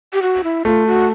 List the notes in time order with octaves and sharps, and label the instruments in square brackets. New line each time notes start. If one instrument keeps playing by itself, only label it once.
[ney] G4
F#4
E4
[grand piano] A3 [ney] F4
[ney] F#4